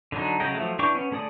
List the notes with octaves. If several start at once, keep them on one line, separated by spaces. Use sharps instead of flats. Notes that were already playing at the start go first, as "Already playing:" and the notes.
D3 F#3 D4 D#4
C#3 F#3 G#3 D#5 G5
F3 F#3 A3
E3 D4 G5 C#6 D6
B3 C#4
D3 A3 G#4 D5 D#6